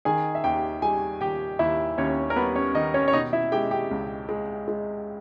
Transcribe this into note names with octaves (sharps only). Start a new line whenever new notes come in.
D#3 G#4 G#5
E5
D#2 G4 G5
G3 G#4 G#5
D#2 G4 G5
D#2 E4 E5
D#2 C#4 C#5
A#4
G3 B3 B4
C#4 C#5
D#3 D#4 D#5
C#4 C#5
C#5
B2 D#4 D#5
E4 E5
G#3 G4 G5
G4 G5
C#2
G#3
G#3